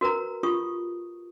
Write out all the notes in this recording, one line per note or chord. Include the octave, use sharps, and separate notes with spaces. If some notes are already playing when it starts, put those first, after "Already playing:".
F#4 A#4 B4 A#5
F4 G4 C#6 D#6